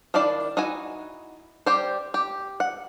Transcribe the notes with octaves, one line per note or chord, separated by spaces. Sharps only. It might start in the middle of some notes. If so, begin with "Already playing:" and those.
D#3 D4 E4 D5 F5
D#4 E4 F#4 G#5
G3 G4 C5
G4
F#5